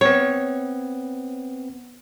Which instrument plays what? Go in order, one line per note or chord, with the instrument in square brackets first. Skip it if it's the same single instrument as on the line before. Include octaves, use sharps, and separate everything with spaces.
[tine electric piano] B3 C4 [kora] C#5